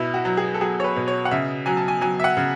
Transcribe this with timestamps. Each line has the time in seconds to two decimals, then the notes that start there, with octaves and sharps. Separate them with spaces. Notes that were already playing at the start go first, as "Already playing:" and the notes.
Already playing: B2 E4
0.14 F#4
0.25 F#3
0.37 G#4
0.54 A4
0.61 F#3 G#4
0.80 C#5
0.84 B4
0.96 B2
1.08 C#5
1.25 F#5
1.31 C#3 E5
1.66 F#3 G#5
1.77 A5
1.88 G#5
2.01 F#3 G#5
2.20 E5
2.24 F#5
2.37 C#3